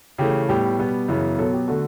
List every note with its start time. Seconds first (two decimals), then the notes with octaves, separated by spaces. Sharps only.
0.18 C#3 E3 A3 G4
0.49 A2 G3 B3 G4
0.79 B2 G3 B3
1.08 F#2 C#3 E3 B3
1.38 B2 F#3 B3 A4
1.53 G4
1.68 D3 A3 F#4